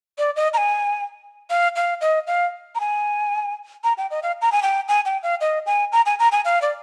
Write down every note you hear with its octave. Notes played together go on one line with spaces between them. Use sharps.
D5
D#5
A#5
G#5
F5
F5
D#5
F5
A#5
G#5
A#5
G5
D#5
F5
A#5
G#5
G5
G#5
G5
F5
D#5
G#5
A#5
G#5
A#5
G#5
F5
D5